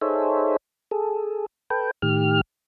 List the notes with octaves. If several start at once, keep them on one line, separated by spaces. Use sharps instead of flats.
D#4 G#4 A4 C5 C#5 E5
G#4 A4
A4 B4 G5
A2 D#3 G4 F6